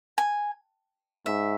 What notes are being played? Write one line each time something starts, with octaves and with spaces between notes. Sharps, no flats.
G#5
G#2 E5